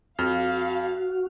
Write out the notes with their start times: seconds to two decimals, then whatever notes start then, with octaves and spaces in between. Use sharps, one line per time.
0.19 F2 F#4 F5 F6